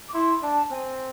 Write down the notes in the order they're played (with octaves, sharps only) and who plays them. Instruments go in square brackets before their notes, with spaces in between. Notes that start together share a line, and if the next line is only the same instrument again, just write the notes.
[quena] D6
[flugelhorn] E4 [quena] C6
[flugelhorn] D4 [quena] A5
[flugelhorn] C4 [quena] G#5